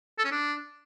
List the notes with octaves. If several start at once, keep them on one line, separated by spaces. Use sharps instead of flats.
A4
C#4
D4